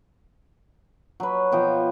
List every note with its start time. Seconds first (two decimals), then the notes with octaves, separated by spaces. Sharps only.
1.20 F#3 B4
1.52 B2 F3 G5